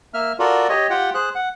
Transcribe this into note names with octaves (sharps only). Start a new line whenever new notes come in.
A#3 E5 F6
F4 F#4 A4 A#4 D5
G4 C#5 D#5
F4 G4 F#5 G5
G#4 C5 F#6
F#5